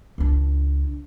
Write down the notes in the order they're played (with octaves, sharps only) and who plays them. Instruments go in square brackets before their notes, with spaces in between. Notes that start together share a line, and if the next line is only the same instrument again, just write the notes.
[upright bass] C#2 D4